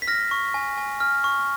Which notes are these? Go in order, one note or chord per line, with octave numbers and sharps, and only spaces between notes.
B6
F6 A#6
C#6
G#5
G#5
F6
C#6